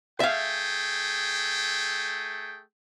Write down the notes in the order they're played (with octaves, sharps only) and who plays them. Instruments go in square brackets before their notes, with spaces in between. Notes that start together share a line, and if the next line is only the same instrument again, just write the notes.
[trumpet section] A3 G#4 G5 [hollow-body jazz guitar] E5 F5